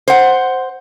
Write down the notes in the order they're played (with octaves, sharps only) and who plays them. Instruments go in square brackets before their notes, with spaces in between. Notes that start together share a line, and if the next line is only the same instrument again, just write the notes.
[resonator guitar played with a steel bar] C5 F#5